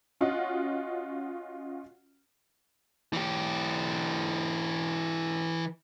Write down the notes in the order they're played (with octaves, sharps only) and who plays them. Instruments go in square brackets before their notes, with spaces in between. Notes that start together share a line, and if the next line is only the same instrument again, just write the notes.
[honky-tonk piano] C#4 F4 F#4 D#5 F#5
[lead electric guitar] E3 G4